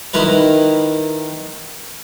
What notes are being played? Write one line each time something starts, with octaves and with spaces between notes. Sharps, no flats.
D#3 E4 A#4 B4